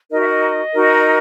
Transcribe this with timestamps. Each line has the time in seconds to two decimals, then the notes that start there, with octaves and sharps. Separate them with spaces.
0.10 D#4 F#4 A#4 D#5
0.21 E5
0.30 D#5
0.73 D#4 F#4 A#4